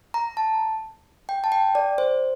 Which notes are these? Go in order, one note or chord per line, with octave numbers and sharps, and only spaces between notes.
A#5
A5
G5
A5
G5
D5
C5